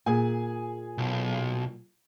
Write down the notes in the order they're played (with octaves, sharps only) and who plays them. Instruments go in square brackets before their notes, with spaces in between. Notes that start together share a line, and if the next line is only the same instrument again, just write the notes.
[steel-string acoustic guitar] A#2 [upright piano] G#4 G#5
[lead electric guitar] B1